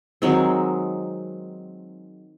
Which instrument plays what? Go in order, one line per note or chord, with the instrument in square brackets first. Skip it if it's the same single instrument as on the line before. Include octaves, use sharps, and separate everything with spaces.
[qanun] D#3 F#3 G#3 C4